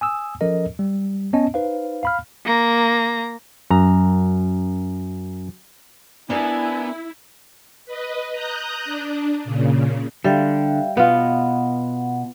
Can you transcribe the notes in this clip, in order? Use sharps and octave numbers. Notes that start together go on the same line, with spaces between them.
G#5 D#6 E6
F3 C#4 A4 A#4 D#5
G3
B3 C#4 D#5 A5
D#4 B4 C5 F5
F5 B5 F6
A#3 A#5
F#2 A#5
B3 D4 E4 A#4 D5 G#5
B4 D#5
A#5 D#6 F#6 G6
D4
A#2 C#3
D3 G3 E5 F5 G5
B2 B3 F4 F#5